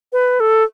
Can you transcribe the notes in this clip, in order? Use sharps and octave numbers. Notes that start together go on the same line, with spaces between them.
B4
A4